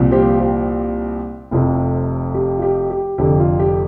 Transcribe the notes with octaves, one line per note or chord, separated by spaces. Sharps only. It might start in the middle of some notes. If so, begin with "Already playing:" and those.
Already playing: C2 A#2 F3
G4 C5
G4 C5
F1 F2 C3
G4
F4
G4
G4
F1 F2 D3 G4
F4
G4